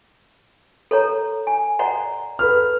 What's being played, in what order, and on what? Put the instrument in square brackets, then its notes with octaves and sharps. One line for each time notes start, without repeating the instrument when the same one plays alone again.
[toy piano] A4 C#5 A#5
G#5
D5 F#5 A#5
[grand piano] A4 B4 F6